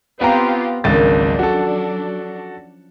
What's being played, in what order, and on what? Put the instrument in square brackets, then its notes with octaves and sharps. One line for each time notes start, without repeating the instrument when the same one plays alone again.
[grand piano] B3 A#5 [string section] C4 F4 G4
[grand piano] G#1 C#2 A6 [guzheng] D#3 F3 [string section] F#3 D4
[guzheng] C#4 [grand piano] F#4 A4